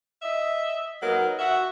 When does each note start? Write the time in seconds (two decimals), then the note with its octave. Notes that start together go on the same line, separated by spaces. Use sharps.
0.22 D#5 E5
1.01 F#3 D#4 A#4 B4
1.39 F#4 E5